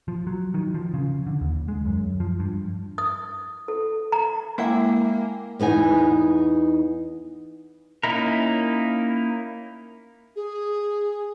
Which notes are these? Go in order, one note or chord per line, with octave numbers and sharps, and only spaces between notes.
F3
F#3
D#3
F3
C#3
D3
D#2
G#3
F#2
F3
G2
D#6
A4
A#5
G#3 A#3 E4 E5 F#5 G5 D6
E2 B3 D#4 G#5
A#3 C#4 D#4 E4 A#4
G#4